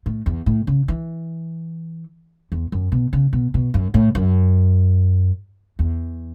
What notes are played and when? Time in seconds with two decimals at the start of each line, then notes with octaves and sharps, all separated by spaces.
0.06 A2
0.26 E2
0.46 A2
0.67 C#3
0.88 E3
2.52 E2
2.72 F#2
2.92 B2
3.13 C#3
3.33 B2
3.54 B2
3.74 F#2
3.94 A2
4.15 F#2
5.79 E2